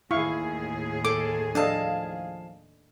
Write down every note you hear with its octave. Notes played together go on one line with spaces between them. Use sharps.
D#2 A2 E4 G#4 F5 C#6
A4 D6
F3 D4 A4 D#5 F5 A5